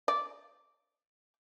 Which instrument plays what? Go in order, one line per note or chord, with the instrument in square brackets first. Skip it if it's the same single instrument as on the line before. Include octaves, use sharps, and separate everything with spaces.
[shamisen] D5